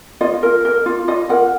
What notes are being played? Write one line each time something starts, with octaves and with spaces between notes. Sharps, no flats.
F4 D#5
A#4
A#4
F4
F4 D#5
A#4 F#5